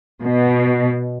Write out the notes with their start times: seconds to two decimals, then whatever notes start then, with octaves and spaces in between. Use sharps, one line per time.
0.22 B2